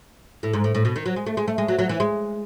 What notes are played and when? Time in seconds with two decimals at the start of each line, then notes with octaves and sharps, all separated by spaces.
0.43 A2
0.53 G#2
0.64 A2
0.75 A2
0.85 B2
0.96 D#3
1.06 F#3
1.16 G#3
1.26 A3
1.37 G#3
1.48 A3
1.58 G#3
1.68 F#3
1.79 F#3
1.89 E3
2.00 G#3